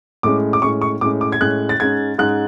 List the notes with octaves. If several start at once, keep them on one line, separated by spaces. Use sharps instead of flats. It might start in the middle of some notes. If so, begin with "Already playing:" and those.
A2 G#3 C#4 D6
D6
A2 G#3 C#4 C#6
C#6
A2 G#3 C#4 D6
D6
G#6
A2 G#3 C#4 F#6
A6
G#2 G#3 C#4 G#6
G#2 G#3 C#4 F#6